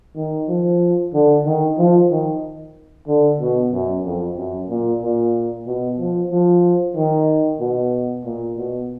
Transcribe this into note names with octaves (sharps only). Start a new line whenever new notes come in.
D#3
F3
D3
D#3
F3
D#3
D3
B2
F#2
F2
F#2
A#2
A#2
B2
F3
F3
D#3
B2
A#2
B2